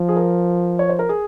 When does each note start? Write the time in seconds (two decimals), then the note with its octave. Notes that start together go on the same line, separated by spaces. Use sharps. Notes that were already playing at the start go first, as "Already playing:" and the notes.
Already playing: F3
0.09 G#4
0.16 A#4
0.79 C#5
0.89 C5
0.99 A#4
1.09 G#4